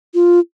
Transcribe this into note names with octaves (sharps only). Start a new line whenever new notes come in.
F4